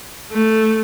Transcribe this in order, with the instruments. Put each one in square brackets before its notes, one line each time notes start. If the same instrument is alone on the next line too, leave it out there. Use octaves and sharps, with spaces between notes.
[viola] A3